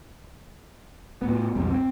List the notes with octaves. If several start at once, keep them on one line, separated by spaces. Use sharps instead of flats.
A2 B3
B1 F2 G#2 G3
C4